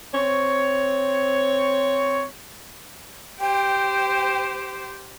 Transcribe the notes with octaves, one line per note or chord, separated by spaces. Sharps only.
C4 C#5
G4 C5 G5